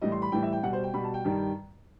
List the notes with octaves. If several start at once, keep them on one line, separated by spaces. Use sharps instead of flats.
A2 E3 G3 D#5
C6
B5
A2 E3 G3 G5
E5
G5
B2 G3 F#5
C5
G5
B2 G3 B5
A5
G5
G2 D#3 G3